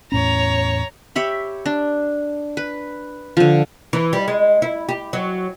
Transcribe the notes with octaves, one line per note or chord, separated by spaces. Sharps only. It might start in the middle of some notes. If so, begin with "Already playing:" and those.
E2 A2 C#4 C#5 A#5
G4 C#5 E5 B5
D4
B4
D3 F3
E3
G3
G#3
E4
G4
F#3